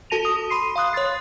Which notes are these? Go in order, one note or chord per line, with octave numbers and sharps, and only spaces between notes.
F#4 A4 A5 A#6 D#7 F7
D#6
B5 C6 C7 D#7
F5 C6 D#6 F#6
C#5 C6 F#6 A6 C7